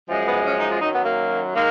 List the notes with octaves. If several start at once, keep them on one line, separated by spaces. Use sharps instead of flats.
F#2 F3 G#3
B3
C#4
D#4
F4
F#2 D#3 F#3 D#4
B3
A#3
D#3 G#3 A#3